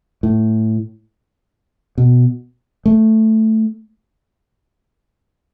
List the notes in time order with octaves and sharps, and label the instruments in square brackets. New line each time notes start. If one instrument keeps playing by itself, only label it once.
[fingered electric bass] A2
B2
A3